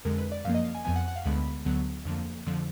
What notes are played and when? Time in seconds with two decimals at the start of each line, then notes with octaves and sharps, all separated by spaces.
0.05 F2 D3 G#3 A#4
0.18 B4
0.32 D5
0.45 F#2 F3 A#3 F5
0.54 D#5
0.65 F5
0.75 G#5
0.85 F2 F3 B3 G#5
0.96 F#5
1.08 F#5
1.16 F5
1.25 D2 D3 G#3 B3 B5
1.65 D2 D3 F#3 B3
2.05 F2 D3 F3 A#3
2.46 F2 D3 F3